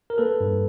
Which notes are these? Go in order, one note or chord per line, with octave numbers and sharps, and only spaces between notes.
A#4
A#3 A4 B4
G2